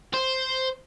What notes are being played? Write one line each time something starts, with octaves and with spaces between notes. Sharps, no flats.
C5